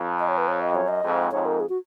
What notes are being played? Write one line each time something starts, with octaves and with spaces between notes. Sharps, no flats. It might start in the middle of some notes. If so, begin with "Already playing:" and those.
Already playing: F2
D#5
C#5
B4
C#5
D#5
F#2 C#5
D#5
F2 G#2
F2 G#2 C#5
A#4
G#4
F#4